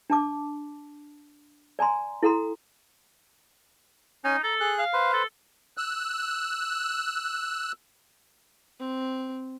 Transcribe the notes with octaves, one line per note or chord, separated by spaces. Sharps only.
D4 A5 D6
D5 G#5 A#5 C6
E4 A4 F#5 A#5 C6
C#4 D#4 G#5
A4 A#5
G#4 F#6
F5
B4 C5
A4
E6 F#6
C4